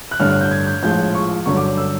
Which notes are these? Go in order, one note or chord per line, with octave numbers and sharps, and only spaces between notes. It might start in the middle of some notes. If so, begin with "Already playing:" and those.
F#6
A1 G2 D3 F6
F#6
G6
G#6
G6
A#1 A2 F3 G#3 G6
C#6
G1 F#2 D3 F#3 C#6
D6
E6